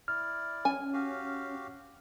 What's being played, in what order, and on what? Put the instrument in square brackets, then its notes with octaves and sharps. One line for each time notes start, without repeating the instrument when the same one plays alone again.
[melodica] E4 D5 [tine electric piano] F6
[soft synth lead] C#4 [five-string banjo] G#5
[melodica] F#4 G4 F5